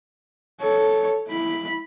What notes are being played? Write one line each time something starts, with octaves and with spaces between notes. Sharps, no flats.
A4 C#5
E4 B5